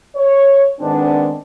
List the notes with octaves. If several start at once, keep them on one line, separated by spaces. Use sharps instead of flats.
C#5
G#2 D#3 B3 C4 D4